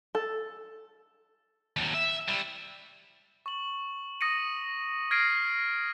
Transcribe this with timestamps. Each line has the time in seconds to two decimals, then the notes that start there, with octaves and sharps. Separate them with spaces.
0.15 A4
1.77 D#2 F#3
1.94 E5
2.28 G3 E4
3.46 C#6 F#7
4.21 D#6 A#6 C#7 D#7
5.11 F6 G#6 A#6 C7 D7 D#7